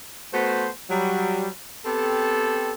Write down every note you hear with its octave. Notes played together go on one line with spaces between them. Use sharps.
A3 B3 F#4 C5
F#3 G3
B3 C4 G4 A4